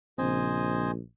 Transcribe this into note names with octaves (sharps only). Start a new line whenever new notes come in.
A#1 C#3 C4 C5 D#5 G#5